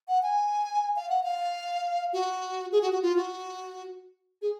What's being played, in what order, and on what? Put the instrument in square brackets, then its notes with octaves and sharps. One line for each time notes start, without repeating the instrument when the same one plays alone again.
[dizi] F#5
G#5
F5
F#5
F5
F#4
G#4
F#4
F#4
F4
F#4
G#4